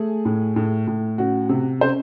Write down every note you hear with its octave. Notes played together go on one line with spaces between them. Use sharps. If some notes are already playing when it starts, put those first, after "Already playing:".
Already playing: A3 G#4
A2
A2
A2
C#4 F#4
C3
C#4 C5